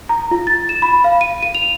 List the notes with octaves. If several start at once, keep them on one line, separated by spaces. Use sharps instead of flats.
A#5
F4
A6
E7
B5
F5
D#7
D#7
F7